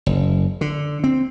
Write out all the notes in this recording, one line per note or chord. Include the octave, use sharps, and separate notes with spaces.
F#1
D3
C4